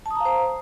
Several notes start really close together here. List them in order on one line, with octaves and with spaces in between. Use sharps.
A5 D#6 A#5 F5 C5